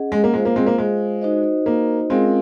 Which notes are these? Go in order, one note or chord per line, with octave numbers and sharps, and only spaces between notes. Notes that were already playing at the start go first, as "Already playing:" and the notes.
Already playing: C#4 G#4 D#5 F#5
G#3
A#3
G#3 F4 C5 F5
A#3
G#3 C4
A#3
G#3
D#4 F#4 C5 D#5
A#3
G#3 C4 C#4 F4 A#4 F5